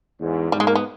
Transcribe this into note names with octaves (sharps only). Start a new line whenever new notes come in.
E2 G#2
G#2 B2 G3
G#3
A#3
B3